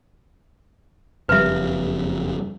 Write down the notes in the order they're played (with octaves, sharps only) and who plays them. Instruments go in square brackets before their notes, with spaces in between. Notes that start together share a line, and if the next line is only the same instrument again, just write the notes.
[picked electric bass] F#1 F2 G3 [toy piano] B4 E5